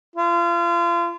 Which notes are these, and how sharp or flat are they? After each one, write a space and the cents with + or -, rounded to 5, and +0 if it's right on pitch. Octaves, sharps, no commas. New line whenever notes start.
F4 -35